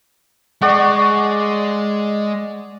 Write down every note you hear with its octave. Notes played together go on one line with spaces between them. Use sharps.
G#3 D5 F#5 C#6